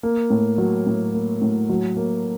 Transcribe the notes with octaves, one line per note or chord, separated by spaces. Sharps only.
A#3
A2
F#3
A2
A#3
A2
F#3
A#3